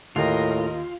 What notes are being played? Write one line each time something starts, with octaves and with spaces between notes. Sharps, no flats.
D#2 A2 F4 A#4 D#5